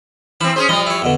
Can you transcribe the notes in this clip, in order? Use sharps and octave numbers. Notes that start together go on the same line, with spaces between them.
E3 C4 A5 B5
C#4 G#4 C5
F3 G3 D#5 A#5
E4 C#5
E2 B2 D3